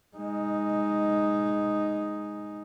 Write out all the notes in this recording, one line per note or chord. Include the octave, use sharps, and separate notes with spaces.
G#3 D#4